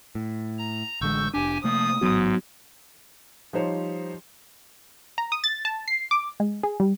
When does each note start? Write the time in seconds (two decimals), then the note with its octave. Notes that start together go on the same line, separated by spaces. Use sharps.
0.15 A2
0.59 A#5
1.01 A1 D3 G#3 C#6 E6 G6
1.34 F1 D4 G4 G#5
1.64 C3 F3 A3 A#3 D#6
2.01 A1 G#2 F#3 B3 F#4
3.53 F3 G3 D#4 C5 C#5
5.18 A#5
5.32 D#6
5.44 A6
5.65 A5
5.88 C7
6.11 D6
6.40 G#3
6.63 G#4
6.80 G3